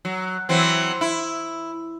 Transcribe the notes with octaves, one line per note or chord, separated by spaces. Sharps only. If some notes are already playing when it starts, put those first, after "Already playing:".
F#3
E3 F#3 C4
E4